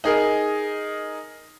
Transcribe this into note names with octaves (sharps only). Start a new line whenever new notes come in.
D#4 G#4 A#4